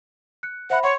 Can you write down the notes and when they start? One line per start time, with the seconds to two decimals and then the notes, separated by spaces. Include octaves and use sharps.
0.43 F#6 C#7
0.70 C5 E5 F#5 B5
0.83 C#5 F#5 C6 C#6